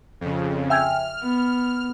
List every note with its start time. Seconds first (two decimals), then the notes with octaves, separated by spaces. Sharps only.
0.21 F2 C#3
0.70 E5 G5 G#5 F6
1.23 B3